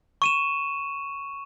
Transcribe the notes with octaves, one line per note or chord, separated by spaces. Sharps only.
C#6 D#7 E7